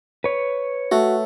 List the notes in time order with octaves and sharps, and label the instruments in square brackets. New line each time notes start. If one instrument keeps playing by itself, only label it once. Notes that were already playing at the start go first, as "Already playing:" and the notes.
[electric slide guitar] B4 C#5
[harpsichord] A3 [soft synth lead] F#4